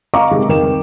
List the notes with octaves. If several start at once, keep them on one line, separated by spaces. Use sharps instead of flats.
D#5 F5 A#5 C#6 D6
C3 D#3 G#3 G4
C2 F2 D#3 A#4 G5 E7